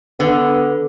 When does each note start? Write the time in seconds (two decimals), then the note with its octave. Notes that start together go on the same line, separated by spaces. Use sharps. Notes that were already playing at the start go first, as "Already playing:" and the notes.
0.20 D3 B3